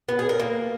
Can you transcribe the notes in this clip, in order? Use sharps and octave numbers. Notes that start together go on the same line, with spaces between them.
B3
G#4
A#4
A#3